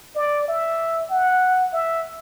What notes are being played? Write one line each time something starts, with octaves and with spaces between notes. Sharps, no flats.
D5
E5
F#5
E5